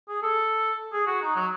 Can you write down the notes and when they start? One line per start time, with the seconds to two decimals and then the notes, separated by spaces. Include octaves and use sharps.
0.09 G#4
0.23 A4
0.93 G#4
1.07 F#4
1.22 D#4
1.36 F#3